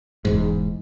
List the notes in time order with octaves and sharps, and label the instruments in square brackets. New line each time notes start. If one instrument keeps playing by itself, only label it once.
[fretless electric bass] E1 E2 G#2